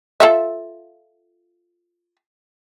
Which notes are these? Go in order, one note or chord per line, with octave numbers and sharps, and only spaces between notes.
F4 A4 E5